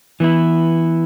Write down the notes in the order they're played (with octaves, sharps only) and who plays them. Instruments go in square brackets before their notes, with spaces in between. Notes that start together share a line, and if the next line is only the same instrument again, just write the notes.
[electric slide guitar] E3 B3 E4